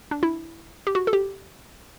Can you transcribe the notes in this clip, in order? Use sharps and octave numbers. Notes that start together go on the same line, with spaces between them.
D4
E4
G4
F#4
A4
G4